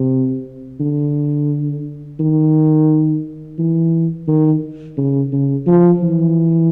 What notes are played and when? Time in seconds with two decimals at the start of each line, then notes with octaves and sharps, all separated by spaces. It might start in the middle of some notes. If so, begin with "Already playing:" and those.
Already playing: C3
0.80 D3
2.20 D#3
3.58 E3
4.28 D#3
4.98 C#3
5.32 C#3
5.67 F3
6.02 E3